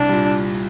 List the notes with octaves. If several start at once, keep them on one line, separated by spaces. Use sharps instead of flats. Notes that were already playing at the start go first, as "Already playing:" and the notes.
Already playing: C2 D4
A#2 G3